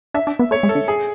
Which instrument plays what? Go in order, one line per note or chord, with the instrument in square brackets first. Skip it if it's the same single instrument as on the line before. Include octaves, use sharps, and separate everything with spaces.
[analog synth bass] D4 [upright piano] E5
[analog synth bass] D4
B3
[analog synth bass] A3 [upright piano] C#5
[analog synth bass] G#3
[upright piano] A4
[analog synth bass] D3
[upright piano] G#4